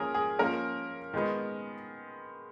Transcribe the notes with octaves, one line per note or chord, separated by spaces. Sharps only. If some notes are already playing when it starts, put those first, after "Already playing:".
Already playing: F3 A#3 C#4 G#4 A#4
G#4
F3 A#3 C#4 A#4
D#3 G#3 B3